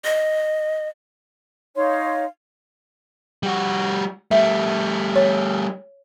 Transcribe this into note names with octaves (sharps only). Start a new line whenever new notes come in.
D#5
D#4 C#5 F5 C6
G3 F#4
G3 A3 E5
C#5